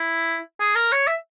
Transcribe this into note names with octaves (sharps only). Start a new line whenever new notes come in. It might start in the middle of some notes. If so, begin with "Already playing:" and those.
Already playing: E4
G#4
A#4
C#5
E5